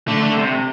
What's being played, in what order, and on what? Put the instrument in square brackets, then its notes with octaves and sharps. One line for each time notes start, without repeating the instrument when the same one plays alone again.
[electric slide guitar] D3 [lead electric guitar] A3
[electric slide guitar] D3
C3